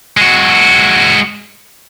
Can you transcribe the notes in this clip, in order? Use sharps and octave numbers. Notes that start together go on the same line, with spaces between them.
G#3 F#4